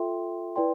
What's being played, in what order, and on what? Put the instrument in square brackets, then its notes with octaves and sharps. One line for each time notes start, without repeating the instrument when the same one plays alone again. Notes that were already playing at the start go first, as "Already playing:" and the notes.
Already playing: [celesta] F4 A4 E5 G5 C6
E4 B4 D5 G5 C6